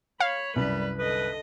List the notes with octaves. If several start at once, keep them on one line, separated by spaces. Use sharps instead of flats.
C#5 F5 B5
C2 F#2 G3 B4
D3 B4 D#5